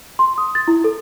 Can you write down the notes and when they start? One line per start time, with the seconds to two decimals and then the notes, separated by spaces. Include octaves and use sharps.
0.19 C6
0.38 D#6
0.55 A6
0.68 E4
0.84 A4